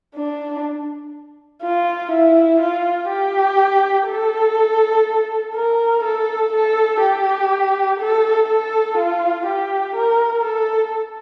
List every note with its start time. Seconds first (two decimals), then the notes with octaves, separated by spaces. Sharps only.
0.15 D4
1.62 F4
2.11 E4
2.60 F4
3.09 G4
4.08 A4
5.54 A#4
6.03 A4
6.52 A4
7.01 G4
7.99 A4
8.48 A4
8.98 F4
9.46 G4
9.95 A#4
10.44 A4